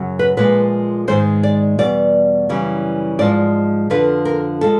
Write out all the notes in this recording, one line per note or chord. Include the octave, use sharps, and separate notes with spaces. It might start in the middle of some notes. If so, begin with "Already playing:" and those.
Already playing: F#2 C#3 F#3
B4
A#2 F3 G#3 B4
G#2 D#3 G#3 C5
D5
E2 B2 G3 D5
F#2 C#3 E3 G3
G#2 F3 G#3 D5
F2 D3 F3 B4
A#4
F3 G#3 A4